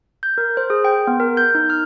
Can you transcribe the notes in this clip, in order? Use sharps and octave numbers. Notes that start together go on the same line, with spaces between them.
G6
A#4
C5
G#4
G5
B3
A#4
G6
D#4
F6